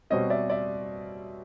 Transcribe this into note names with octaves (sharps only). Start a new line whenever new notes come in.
B2 G3 C4 C#5 D#5
D5 E5
D5 E5